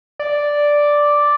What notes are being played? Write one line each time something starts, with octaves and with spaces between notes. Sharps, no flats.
D5